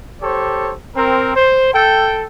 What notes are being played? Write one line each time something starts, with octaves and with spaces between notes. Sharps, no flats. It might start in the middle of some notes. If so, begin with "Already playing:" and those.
G4 A4 C5 C#5
C4 A#4
C5
A4 G5